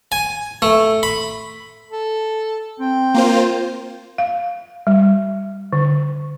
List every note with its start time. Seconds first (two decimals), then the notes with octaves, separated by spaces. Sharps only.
0.12 G#5
0.62 A3
1.03 B5
1.91 A4
2.80 C4 G5
3.14 A#3 F4 C5
4.18 F5
4.87 G3
5.73 D3